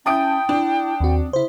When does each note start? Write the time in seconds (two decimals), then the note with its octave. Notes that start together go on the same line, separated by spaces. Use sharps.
0.06 C#4 E4 G5 A5 D#6 G6 D7
0.49 D4 E4
1.00 D#2 C4 F#4
1.33 C#3 E4 C5